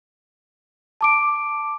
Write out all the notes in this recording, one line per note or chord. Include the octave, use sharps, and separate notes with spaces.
A5 D6 D7